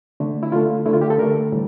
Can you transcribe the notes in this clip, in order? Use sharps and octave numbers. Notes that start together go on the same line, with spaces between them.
D3 A3
E4
D3 A3 F4
D3 A3 E4
F4
G4
A4
D3 A3 A#4
A2 E3 G3